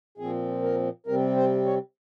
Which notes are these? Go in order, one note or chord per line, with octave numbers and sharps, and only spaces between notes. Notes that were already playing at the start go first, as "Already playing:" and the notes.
A#2 F3 C4 G#4
A#4
C3 G3 C4 A#4
C5
C#5